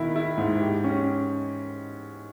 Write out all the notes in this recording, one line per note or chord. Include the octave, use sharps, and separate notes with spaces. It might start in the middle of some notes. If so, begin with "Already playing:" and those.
Already playing: B2 D#3 E4
E4
G#2
G4
C#4